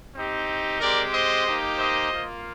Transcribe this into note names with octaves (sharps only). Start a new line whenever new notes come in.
C4 D#4 G4
G#3 C4 G4 A#4 D5
C5 D#5
A#3 D#4 G4
C5 D#5
A#3 F4